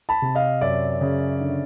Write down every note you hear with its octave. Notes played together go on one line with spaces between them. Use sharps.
A5 B5
C3
D#5 F5
F#2 D5 E5
C#3
D3